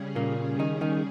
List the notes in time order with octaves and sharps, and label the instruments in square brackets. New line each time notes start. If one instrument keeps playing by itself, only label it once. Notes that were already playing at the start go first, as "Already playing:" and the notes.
Already playing: [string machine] C#3 G3 C#4 G#4
[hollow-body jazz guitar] A#2 A#3
D#3 D#4
D#3 D#4